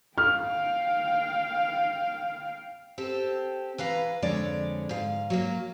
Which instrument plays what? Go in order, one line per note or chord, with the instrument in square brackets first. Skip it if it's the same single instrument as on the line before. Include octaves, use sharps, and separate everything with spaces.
[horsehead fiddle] F5 G5 [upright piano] F6
[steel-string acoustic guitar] C4 G4 A4
E3 B4 F5 A#5
F2 D3 G#3 C#5 D5
G#2 F5
F#3 G3 A#3